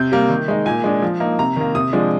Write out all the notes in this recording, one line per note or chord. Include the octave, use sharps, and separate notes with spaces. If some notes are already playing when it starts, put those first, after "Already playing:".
Already playing: C3 G6
G3 A#3
D#3
G#3 D#4
A#2 G#5
G#3 D4
F3
A#3 D#4
C3 A#5
D#3 A#3
C3 D#6
F3 G#3 D4